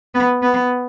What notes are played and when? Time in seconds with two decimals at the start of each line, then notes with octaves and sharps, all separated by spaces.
0.15 B3
0.42 B3